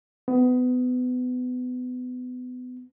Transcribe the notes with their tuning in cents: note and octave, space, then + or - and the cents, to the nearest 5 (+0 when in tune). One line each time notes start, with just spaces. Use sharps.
B3 +25